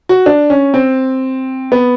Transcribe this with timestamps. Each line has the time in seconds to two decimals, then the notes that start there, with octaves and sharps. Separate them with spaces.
0.09 F#4
0.26 D4
0.50 C#4
0.74 C4
1.72 B3